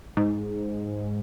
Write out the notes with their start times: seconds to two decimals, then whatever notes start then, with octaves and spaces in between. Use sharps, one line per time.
0.17 G#2